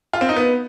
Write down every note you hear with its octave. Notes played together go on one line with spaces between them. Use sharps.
F4
C4
D#4
B3